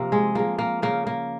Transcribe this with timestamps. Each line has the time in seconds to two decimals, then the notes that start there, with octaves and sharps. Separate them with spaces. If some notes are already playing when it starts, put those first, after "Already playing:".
Already playing: C3 F3 A#3 C4
0.12 G#3
0.35 F3 G#3 A#3
0.59 A#3
0.82 C#3 A#3
1.07 A#3